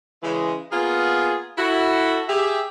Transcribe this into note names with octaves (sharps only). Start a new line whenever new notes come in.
C#3 E3 G#3
A#3 B3 F4 G#4
E4 F#4 A4
G4 G#4 E5